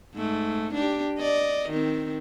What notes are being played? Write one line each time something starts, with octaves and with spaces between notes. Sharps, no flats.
G#2 A3
D4 G4
D5 D#5
D#3 C4